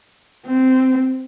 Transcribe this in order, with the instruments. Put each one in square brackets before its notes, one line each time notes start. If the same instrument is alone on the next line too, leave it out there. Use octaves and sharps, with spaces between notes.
[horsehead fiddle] C4